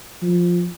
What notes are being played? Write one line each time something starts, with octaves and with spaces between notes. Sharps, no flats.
F3